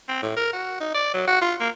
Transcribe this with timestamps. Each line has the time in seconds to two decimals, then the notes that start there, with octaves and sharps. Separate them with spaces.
0.08 C4
0.22 A2
0.37 A#4
0.53 F#4
0.80 D#4
0.94 D5
1.14 F#3
1.27 F#4
1.41 F4
1.60 A#3